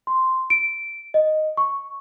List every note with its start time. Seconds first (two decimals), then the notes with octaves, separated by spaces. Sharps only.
0.07 C6
0.50 D7
1.14 D#5
1.57 C#6